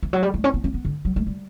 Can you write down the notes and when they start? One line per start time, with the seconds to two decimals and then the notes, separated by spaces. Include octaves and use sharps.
0.03 E3
0.13 F#3
0.23 G3
0.34 A3
0.44 C#4
0.54 B3
0.64 C#4
0.74 B3
0.85 D3
1.05 F#3
1.16 A3
1.27 G3